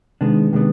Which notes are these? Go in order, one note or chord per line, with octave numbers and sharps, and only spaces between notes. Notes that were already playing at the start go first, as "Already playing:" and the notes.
C3 D#3 G#3 B3 D4
C3 D#3 G#3 B3 D4